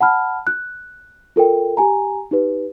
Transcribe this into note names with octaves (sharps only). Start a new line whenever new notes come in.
F#5 A5 B5 F6
F#6
F4 A4 A#4 G5
G4 G#5 A#5
D#4 G4 B4